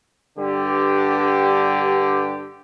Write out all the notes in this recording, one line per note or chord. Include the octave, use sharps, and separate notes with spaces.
G2 D3 G4